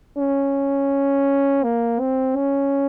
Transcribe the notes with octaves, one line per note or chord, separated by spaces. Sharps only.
C#4
A#3
C4
C#4